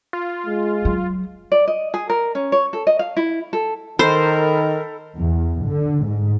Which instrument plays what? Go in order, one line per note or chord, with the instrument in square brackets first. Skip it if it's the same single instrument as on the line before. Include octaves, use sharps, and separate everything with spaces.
[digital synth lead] F4
[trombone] G#3
[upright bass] F#3
[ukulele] D5
D#5
G#4
A#4
C#4
C#5
A4
D#5
F5
E4
A4
[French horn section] D#3 [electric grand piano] A4 B5 [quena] A#4 [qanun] C5
[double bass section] E2
D3
G#2